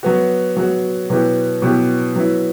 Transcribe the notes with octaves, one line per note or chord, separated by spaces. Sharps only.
F#3 B3 F#4
F#3 B3 F#4
B2 F#3 B3 E4 G4
B2 F#3 B3 E4 G4
F#3 B3 E4